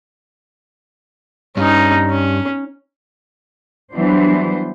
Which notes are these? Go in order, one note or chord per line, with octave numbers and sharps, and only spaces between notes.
G2 C#4 D#4
C#4
E3 F#3 G3 B3 D4 C5